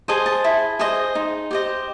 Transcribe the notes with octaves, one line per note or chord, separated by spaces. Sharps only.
G#4 C5 D#5 A5
A5
E4
G#4 C5 D#5
D#4
G4 C5 D#5